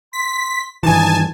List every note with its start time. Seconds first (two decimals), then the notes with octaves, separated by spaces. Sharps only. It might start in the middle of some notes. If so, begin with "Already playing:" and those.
0.13 C6 B6
0.83 G2 D#3 E3 D#4 G#5 A5